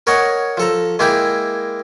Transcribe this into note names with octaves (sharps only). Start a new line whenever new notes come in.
A#4 C#5 D#5 F#5 G#5 D#6
F3 A4 A#5
G#3 A#3 E4 G5 G#5